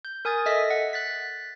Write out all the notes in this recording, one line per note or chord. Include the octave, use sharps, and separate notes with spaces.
G6
A#4 G#5 D#6 G#6 A6
A4 D#5 E5 A#6 B6
F#5
F#6 A6 B6